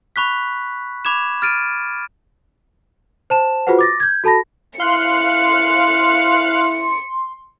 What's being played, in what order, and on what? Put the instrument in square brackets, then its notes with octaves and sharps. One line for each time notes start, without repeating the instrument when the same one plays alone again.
[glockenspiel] B5 C#6 F#6 B6
B5 D6 G#6 E7
F6 A6 D7 D#7
[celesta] C5 A5 E7
F4 F#4 G#4 B4 C5 F#5
D6 A6 A#6
G6 G#6
F#4 A4 A5 B5 A#6
[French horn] E4 [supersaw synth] F5 F#6 [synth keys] C6 [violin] C#7